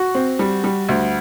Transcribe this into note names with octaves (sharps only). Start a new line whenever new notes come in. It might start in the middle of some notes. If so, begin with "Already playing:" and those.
Already playing: F#4
C4
G3
G3
D2